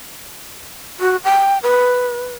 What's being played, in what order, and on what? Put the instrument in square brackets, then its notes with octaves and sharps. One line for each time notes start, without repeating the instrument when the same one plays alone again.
[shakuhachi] F#4
G5
B4